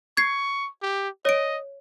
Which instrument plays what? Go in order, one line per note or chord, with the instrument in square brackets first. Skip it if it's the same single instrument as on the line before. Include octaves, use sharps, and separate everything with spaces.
[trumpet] C#6 [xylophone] G#6 C7
[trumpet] G4
[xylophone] C#5 D7 [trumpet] D#5